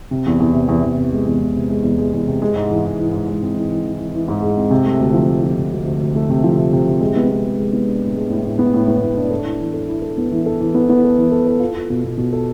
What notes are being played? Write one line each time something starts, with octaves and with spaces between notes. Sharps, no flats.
C3
E2
E2
C3
E2
E2
C3
G#3
E2
C3
C3
G#3
E2
G#3
E2
C3
G#3
G#2
E3
G#2
E3
G#2
G#2
C4
E3
E3
E3
E3
E3
G#2
G#3
C4
C3
A3
D2
F3
D2
F3
C3
D2
D2
D2
A3
C3
F3
C3
C3
C3
G#3
B3
B3
G#3
G#3
B3
D4
A2
G#3
A2
A2
B3
A2
B3
A2
D4
A4
E4
E3
A4
E4
A4
B3
E3
A4
E3
B3
B3
A4
E3
A4
A4
F4
F4
B2
B2
B2
A4